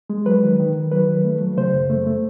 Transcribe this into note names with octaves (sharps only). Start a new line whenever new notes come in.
G#3
F#3 B4
D#3
D#3
D#3
F#3 B4
D#3
A3
F#3
C#3 C5
F#2
A3
A3